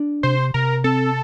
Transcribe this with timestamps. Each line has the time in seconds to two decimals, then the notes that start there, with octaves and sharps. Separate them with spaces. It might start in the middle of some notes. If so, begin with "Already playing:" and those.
Already playing: D4
0.23 C3 C5
0.54 C3 A#4
0.84 C4 A4